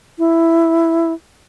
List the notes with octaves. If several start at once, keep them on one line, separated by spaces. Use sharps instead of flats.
E4